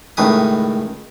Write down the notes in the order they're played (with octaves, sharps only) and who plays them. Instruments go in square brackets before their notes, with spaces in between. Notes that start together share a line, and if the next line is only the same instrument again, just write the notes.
[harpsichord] C#2 A2 D#3 G#3 B4 D#6